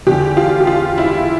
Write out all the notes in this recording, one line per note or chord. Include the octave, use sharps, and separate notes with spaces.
E2 D3 F3 G4
F4
G4
F4
E4